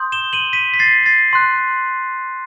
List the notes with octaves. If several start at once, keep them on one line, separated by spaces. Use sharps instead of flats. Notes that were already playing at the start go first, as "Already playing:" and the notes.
Already playing: C6 D#6 G6
E7 G7
D#7 F#7
B6 D#7
B6
A6 C7
A6 C7
C6 F#6